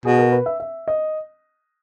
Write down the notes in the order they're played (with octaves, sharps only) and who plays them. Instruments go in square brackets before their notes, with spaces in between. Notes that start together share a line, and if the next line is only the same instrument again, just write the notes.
[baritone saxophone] B2 [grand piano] G#4
[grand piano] A#4
B4
E5
E5
D#5